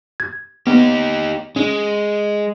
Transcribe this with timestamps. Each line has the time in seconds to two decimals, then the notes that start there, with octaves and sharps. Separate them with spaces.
0.20 G#6
0.67 B3 D#4 G4
1.56 G#3 C#4